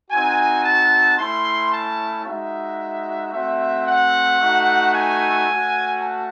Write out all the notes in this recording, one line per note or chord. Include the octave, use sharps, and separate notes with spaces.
C4 D#4 F#4 G#5
A5
A3 C#4 E4 C6
A5
G#3 D#4 F#4 E5
A3 C4 F#4 E5
F#5
A3 D#4 F#4
G#5
A3 C#4 F#4
A5